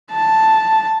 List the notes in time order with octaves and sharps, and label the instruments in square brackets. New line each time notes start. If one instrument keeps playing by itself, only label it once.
[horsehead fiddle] A5